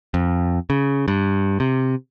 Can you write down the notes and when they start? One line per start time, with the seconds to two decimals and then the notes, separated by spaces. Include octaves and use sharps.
0.14 F2
0.70 C#3
1.08 G2
1.60 C3